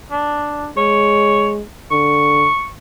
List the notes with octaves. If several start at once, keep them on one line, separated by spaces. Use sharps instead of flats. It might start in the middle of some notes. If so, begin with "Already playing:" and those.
D4
G#3 C#5
D3 C#6